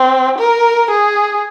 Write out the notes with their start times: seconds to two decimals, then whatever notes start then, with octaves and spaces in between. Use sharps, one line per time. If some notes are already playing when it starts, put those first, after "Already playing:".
Already playing: C4
0.39 A#4
0.91 G#4